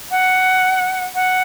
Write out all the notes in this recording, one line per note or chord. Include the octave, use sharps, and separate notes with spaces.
F#5
F#5